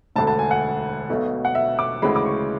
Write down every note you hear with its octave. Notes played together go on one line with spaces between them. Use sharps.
E1 D2 D3 A5
A5
G#5
F#5
B1 B2 A3
F#5
E5
D6
D2 C#3 E3 G#3 B5
D6
C#6